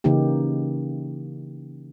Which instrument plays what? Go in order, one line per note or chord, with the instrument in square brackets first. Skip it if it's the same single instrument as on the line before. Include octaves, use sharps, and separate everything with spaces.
[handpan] C#3 E3 A#3 D#4 G4